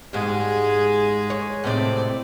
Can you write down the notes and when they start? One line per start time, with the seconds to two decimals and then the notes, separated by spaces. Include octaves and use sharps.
0.13 G#2 G3 G#3 G#4
1.30 C#5
1.64 A2 C3 C4 D#4 D5